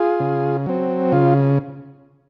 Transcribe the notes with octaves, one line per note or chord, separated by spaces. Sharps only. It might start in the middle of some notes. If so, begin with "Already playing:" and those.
Already playing: F4 G#4
C#3
F#3 C4
C#3 F4